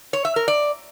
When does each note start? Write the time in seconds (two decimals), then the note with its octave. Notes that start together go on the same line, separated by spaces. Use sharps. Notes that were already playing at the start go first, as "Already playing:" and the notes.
0.13 C#5
0.25 E5
0.36 A#4
0.48 D5